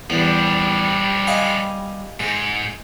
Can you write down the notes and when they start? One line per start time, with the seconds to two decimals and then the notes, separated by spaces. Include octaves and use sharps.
0.10 E2 F3 G3 D4
1.27 D#5 F5 G#5
2.20 G#2 G#3